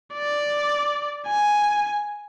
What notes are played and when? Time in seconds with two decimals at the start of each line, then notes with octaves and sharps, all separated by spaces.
0.14 D5
1.27 G#5